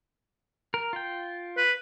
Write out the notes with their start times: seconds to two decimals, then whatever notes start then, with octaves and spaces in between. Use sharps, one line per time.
0.74 A#4
0.93 F4 G5
1.57 B4